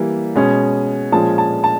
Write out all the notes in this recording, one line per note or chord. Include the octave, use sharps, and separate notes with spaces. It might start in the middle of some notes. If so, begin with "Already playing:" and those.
Already playing: E3 G3 A#3
B2 G#3 C#4
A#2 F3 G#3 C#4 A5
A5
A5